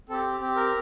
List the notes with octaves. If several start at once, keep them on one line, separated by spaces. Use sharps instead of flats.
C4 G4 A4
C4 G4
A#4